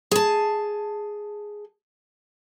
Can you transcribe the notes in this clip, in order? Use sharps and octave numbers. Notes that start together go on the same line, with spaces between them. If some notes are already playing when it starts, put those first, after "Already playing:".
G#4 A5